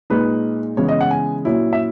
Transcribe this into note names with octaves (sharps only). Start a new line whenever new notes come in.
A#2 G#3 D#4 B4
C#3 E3 G#3 B3 C#5
D#5
F#5
G#5
A#2 F#3 C#4 E4
E5